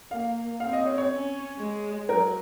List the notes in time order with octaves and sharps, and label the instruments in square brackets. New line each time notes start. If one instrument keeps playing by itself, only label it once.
[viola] A#3 [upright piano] F5
[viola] C4 [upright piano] F5
[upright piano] D#5
C#5
C#5
[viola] C#4
G#3
[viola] F#3 [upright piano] A#4